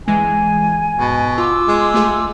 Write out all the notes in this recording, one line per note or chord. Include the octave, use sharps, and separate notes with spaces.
E3 G#3 G#5
G#2 B2
F4 C6 D6 E6
G#3
A3 F4 G#4